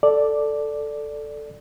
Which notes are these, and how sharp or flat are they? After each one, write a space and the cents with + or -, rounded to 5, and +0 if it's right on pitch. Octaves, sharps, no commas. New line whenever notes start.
A4 +0 D5 +0